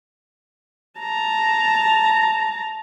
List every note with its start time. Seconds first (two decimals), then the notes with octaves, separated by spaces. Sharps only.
1.00 A5 A#5